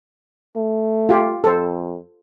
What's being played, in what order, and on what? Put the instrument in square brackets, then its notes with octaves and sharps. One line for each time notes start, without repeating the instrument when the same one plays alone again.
[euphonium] A3
[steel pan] F4 G4
[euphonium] F2 [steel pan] A4 C5